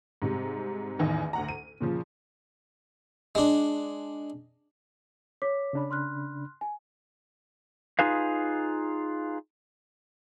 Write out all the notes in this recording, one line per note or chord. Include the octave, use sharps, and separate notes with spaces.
G#2 C3 G3
A1 E2 D#3 E3
D2 F#5 A#5
D#7
A#2 C#3 F3
G#3 D4
C#5 D6 B6
C#3 D4 B5
C6 F6 F#6
G#5
D#4 F4 G#4 B4 F5